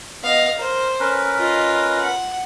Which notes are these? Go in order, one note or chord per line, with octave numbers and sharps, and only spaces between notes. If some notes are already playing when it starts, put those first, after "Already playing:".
B3 D#5 F5
A#4 C5
C#4 A#4 B4
F4 D#5
F#5